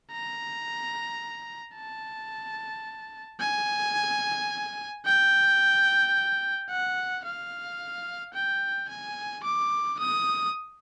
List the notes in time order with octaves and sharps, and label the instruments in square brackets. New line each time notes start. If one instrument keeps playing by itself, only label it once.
[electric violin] A#5
A5
G#5
G5
F#5
F5
G5
G#5
D6
D#6